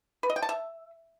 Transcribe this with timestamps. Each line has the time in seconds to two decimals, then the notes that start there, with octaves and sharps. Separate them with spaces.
0.23 B4
0.30 D#5
0.36 G5
0.42 A5
0.49 E5